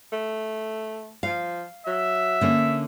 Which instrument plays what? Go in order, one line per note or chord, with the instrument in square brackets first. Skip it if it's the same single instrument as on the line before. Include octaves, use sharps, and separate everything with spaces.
[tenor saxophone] A3
[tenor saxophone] F3 [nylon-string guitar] F5
[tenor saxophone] F#3 [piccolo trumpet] E5
[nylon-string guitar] D3 A#3 C#4